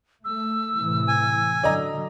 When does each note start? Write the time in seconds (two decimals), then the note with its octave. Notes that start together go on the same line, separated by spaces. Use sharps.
0.25 A3 E6
0.78 A2 C3 E3
1.08 G#5
1.63 D3 F#3 D5 D#5 A#5